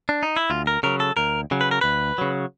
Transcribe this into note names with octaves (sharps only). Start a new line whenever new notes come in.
D4
D#4
E4
D2 F4
A#4
C#3 F#3 A#4
A4
D2 A#4
C#3 F#3
B4
A#4
D2 B4
C#3 F#3